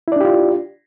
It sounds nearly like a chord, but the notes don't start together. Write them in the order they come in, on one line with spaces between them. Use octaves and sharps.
E4 D5 D4 G4 F4